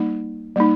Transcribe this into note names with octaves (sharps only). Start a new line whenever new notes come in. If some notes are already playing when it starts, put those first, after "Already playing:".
Already playing: G3 A#3 D#4
G3 A#3 D#4